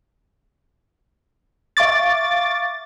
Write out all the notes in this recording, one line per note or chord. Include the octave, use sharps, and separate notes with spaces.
E5 F5 C#6 D6 A6